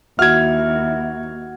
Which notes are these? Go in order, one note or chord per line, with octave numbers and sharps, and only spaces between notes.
D#2 E4 F#4 F6 G#6